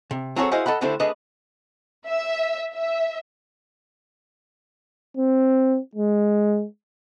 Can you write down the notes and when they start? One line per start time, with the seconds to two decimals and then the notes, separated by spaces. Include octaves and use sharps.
0.11 C3
0.36 F#3 C4 F#4 G#4 A4 C#5
0.51 E4 F#4 G#4 C5 D#5 F5
0.66 A4 D#5 F#5 B5
0.81 D3 G3 A3 D4 E4 C5
1.00 A3 D4 G#4 B4 D#5
2.07 E5
2.72 E5
5.17 C4
5.96 G#3